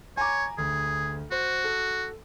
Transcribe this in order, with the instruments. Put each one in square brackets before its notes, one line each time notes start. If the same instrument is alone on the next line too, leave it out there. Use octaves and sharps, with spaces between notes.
[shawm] C#5 [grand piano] G#5 A#5 D6
[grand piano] D2 [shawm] G#4
[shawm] F#4 [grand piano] C5
[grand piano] A4